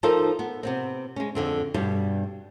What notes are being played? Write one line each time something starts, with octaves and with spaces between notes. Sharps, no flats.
F3 D#4 F4 A4 A#4 C5
B3
C3 B3 C4
G#3 C#4
F2 D3 C4
G2 B2 G3